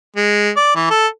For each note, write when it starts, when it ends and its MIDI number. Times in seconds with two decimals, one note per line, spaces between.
0.16 0.50 56
0.56 0.70 74
0.75 0.88 52
0.90 1.07 69